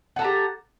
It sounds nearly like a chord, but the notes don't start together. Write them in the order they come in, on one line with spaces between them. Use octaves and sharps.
F#5 A4 A#5 G4